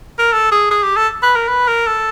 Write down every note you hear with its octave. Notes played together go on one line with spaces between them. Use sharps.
A#4
A4
G#4
G#4
G4
A4
B4
A#4
B4
A#4
A4